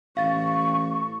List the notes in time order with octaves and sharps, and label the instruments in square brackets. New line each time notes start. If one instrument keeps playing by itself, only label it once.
[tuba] A1 [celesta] F5 A6 [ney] C#6